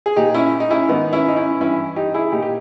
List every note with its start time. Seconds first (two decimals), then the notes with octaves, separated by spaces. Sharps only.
0.06 G#4
0.16 A#2 D#4 G4
0.34 C#4 E4
0.60 D#4
0.71 C#4 E4
0.88 G#2 D#3 B3 D#4
1.13 C#4 E4
1.28 D#4
1.36 C#4 E4
1.60 G2 E3 C#4 E4
1.96 D#4 G4
2.14 E4 G#4
2.32 A#2 D#4 G4
2.42 G4